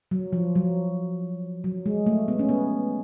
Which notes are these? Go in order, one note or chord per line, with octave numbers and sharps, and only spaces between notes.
F#3
F3
F#3
F#3
G#3
A3
B3
C#4
B3